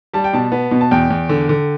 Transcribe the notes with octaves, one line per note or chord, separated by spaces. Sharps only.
G3 A5
G5
B2 A5
B3
B2
A5
E2 G5
E2
D3
D3